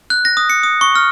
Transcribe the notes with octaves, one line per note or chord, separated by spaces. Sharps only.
F#6
A#6
D#6
C#7
D#6
C#6
F6